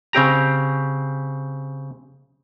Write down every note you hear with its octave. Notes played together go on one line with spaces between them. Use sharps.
C#3 C4 G4 A#5